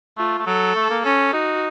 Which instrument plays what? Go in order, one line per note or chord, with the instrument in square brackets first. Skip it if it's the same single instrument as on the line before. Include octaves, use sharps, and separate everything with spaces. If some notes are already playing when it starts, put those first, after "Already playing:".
[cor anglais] A3 [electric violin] F4
[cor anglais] A3
[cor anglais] F#3 [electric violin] A4
[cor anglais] A3
A#3
[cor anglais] C#4 [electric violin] A4
[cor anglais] D#4 [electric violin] F#4